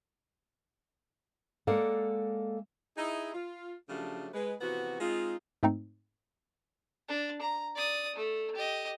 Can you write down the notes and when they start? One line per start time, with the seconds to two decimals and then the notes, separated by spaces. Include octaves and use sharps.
1.67 G#3 A#3 A4 D5 F5 F#5
2.97 D#4 E4 G#4
3.34 F4
3.89 C#3 F3 F#3 A3 D4 G4
4.33 G#3 B4
4.61 C3 E3 F3 B3 F#4
5.00 G#3 C4 D#4 F4
5.63 G#2 A3 C4 D#4
7.08 D4
7.41 A#5
7.75 D5 D#6
8.16 A3
8.55 G4 D#5